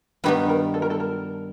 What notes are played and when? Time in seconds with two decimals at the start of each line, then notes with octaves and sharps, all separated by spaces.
0.24 G2 D#3 G3 B3 B4
0.49 A#4
0.74 A4
0.82 A#4
0.90 A4
1.00 A#4